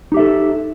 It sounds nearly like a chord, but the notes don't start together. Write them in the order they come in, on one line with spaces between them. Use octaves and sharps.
D#4 G4 E5 A4